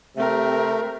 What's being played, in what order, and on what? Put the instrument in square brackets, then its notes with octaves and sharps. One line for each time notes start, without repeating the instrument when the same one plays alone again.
[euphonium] C3 [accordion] A3 [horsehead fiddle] C4 A#4 [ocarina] E5